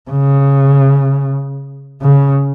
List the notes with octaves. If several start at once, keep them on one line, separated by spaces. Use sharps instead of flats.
C#3
C#3